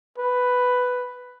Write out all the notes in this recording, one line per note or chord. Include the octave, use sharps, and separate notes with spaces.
B4